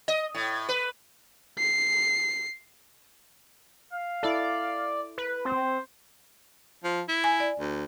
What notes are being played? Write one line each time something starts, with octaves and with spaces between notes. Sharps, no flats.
D#5
A2
B4
C7
F5
E4 A4 D5
B4
C4 C5
F3
E4
G#5
D5
D2